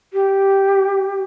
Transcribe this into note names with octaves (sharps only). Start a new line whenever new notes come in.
G4